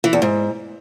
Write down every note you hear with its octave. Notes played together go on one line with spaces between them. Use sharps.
E3
E2
G#2